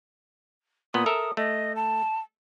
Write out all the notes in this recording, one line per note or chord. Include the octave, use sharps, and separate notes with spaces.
A#2 B3 D#6
A4 A#4 E5
A3 D#5
A5